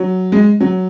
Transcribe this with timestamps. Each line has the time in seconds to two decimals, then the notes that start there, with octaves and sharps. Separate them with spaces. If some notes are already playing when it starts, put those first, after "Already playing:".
Already playing: F#3
0.32 G#3
0.60 F#3